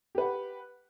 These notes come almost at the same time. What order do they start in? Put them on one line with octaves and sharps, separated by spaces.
G4 B4 F#5